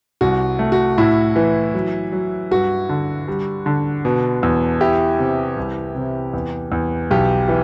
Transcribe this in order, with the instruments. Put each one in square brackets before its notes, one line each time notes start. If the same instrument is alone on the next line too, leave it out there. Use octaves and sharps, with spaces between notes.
[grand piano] C2 [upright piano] F#4
[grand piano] A3
[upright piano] F#4
[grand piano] A2 [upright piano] E4
[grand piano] E3
F#3
F#3
[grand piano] G2 [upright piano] F#4
[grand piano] D3
G3
D3
B2
E2
[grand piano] E4 [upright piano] G4
[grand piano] C3
C2
C3
E2
E2
[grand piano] B1 [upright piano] G4
[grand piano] E3